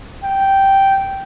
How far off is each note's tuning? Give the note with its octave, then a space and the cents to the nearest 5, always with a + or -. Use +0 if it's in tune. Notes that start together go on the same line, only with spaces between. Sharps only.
G5 -5